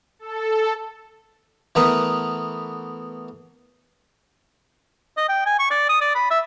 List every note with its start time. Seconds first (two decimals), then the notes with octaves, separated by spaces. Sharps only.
0.19 A4
1.75 E3 A3 B3 A#4 D#6
5.17 D#5
5.29 G5
5.46 G#5
5.59 C#6
5.71 D5
5.89 D#6
6.01 D5
6.15 B5
6.30 E5